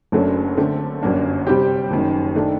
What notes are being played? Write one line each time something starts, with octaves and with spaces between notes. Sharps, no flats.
F#1 F#2 F#3 A3 D4
D3 A3 C4
G1 F#2 F#3 A#3 D4
C3 G3 C4 G4
F#1 F#2 D#3
D#3 A3 D4